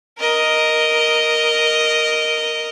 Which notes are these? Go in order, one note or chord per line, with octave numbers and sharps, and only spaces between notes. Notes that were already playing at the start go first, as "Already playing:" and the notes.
A#4 D#5